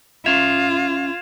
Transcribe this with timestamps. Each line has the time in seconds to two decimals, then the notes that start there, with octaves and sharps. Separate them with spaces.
0.26 C#4 F4 E5 G#6 E7 F7